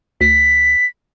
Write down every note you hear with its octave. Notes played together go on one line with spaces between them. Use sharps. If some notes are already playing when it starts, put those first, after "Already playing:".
D2 B6